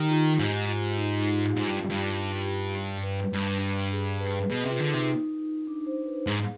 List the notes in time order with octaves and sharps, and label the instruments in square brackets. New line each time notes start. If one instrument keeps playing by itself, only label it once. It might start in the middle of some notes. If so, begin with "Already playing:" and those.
Already playing: [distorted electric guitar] D#3 [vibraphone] D#4 G4
[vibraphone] F4
[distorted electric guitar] G#2 [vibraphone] G4
[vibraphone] F4
D#4
D#4
F4
G4
[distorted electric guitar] G#2 [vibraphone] F4
[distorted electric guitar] G2
[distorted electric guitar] G2 [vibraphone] G4
[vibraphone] G4
G4
B4
[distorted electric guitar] G2
[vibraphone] G#4
B4
[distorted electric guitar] B2 [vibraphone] G#4
[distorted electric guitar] C3 [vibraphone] F4
[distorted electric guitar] D3
[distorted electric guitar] C3 [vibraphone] D#4
[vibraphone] D4
C5
B4
[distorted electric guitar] G#2 [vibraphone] G#4